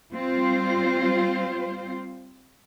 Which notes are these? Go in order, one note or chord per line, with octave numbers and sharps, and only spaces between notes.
G3 C4 F4 C5